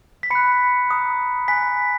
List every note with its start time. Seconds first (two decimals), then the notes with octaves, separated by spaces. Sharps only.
0.23 B6
0.30 B5 F#6 C#7
0.89 A#5 D#6 F#6
1.48 G#5 B5 F#6 B6